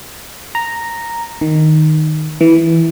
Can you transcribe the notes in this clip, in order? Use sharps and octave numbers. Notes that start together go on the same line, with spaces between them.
A#5
D#3
E3